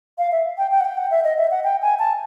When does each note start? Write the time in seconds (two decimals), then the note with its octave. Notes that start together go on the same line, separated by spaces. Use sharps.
0.18 F5
0.32 E5
0.58 G5
0.71 G5
0.80 F#5
0.85 G5
0.97 F#5
1.11 E5
1.24 D#5
1.37 E5
1.51 F#5
1.64 G5
1.82 G#5
1.99 A5